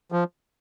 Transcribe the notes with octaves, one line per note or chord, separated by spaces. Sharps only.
F3